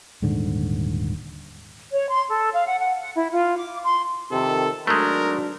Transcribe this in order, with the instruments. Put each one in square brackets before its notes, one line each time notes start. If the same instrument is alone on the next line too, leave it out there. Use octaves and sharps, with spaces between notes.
[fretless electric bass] D#1 G#2 D3
[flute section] C#5
C6
A4
F5
F#5
F#5
F#5
E4
F4
D6
C6
[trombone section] F2 C3 D#3 [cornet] A4
[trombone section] G#1 F#3 D4 [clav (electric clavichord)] G#3 A3 [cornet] A#4